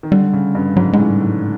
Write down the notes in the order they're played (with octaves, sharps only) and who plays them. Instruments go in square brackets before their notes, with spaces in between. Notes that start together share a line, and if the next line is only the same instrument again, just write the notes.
[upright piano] D#3
[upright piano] D3 [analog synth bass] G3
[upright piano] C#3
G2
[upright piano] G#2 [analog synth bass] F#3
[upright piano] G#2 [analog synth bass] G#3
[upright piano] A2
[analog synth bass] G3
[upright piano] A2
[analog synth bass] F#3